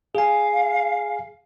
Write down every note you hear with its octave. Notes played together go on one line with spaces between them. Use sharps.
G#4 F5 G#5